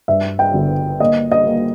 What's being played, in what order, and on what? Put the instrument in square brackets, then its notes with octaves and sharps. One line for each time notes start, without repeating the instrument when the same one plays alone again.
[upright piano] G2 E5
G5
G1
A#3 D#5
D#5
A#3